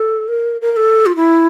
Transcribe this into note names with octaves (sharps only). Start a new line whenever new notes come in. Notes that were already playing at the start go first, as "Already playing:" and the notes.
Already playing: A4
A#4
A#4
A#4
A4
F4
E4